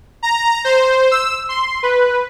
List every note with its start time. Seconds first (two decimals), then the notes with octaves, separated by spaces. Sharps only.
0.23 A#5
0.64 C5
1.11 E6
1.49 C6
1.83 B4